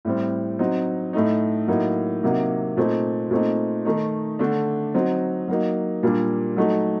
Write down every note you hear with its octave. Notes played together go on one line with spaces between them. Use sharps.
A2 G3 C4
F#3 C4 D#4
A2 A3 D#4
A2 F#3 A#3 D#4
C3 F#3 A#3 D#4
A#2 A3 C4 D#4
A#2 A3 C4 D#4
D#3 A3 D#4
D3 A3 D4
F#3 C4 D#4
F#3 A#3 D#4
A#2 G3 A#3 D4
F#3 A3 D#4